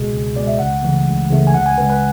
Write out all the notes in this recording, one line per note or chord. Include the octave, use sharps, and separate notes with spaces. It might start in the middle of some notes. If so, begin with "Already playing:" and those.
Already playing: C#2 B2 G#3 G#4
C#2
B2 G#3 D5
E5
C#2 F#5
C#3 E3 A3
C#2
C#3 E3 A3
G#5
C#2 F#5
G#5
C#3 G#3 B4
B4